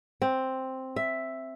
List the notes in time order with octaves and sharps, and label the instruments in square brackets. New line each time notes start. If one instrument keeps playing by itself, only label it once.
[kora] C4
E5